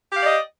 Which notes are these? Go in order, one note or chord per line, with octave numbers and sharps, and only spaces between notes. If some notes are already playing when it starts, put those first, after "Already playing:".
G4 D5 D#5 F5